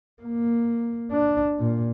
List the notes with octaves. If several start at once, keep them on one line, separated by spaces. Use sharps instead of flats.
A#3
D4
A#2